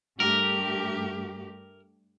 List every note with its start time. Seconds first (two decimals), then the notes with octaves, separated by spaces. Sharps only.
0.20 G2 A3 G4 A#4